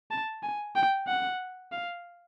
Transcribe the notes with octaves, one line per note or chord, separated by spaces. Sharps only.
A5
G#5
G5
F#5
F5